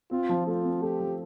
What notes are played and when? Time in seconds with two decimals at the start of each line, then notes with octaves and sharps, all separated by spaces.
0.11 C4 F4
0.29 F3
0.47 A3 F4
0.64 C4
0.82 A3 G4
1.00 F3